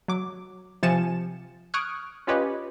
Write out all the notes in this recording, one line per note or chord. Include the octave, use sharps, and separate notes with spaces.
F#3 D6
C3 F3 G#5 A6 C#7 E7
C#6 D#6 F6 F#6 G#6 D7
C#4 F4 G4 B4 C#5 D#5